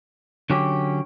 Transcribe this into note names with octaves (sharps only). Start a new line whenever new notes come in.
D3 F#3 C#4 G4